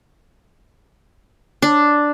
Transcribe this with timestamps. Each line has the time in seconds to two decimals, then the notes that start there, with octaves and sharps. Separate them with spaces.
1.62 D4